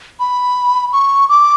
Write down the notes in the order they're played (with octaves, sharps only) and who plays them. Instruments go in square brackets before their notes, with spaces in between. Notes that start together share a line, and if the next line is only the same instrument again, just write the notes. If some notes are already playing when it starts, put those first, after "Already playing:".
[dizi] B5
C#6
D6